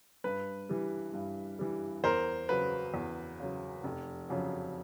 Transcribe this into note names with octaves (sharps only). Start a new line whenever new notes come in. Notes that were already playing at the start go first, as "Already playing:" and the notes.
G2 B4
E3 G3
G2
E3 G3
E2 A#4 C5
C#3 F#3 B4
E2
C#3 F#3
F1
F2 C#3 F#3